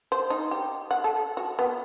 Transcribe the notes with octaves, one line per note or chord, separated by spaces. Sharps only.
C5
D#4
G4
F#5
A4
F#4
B3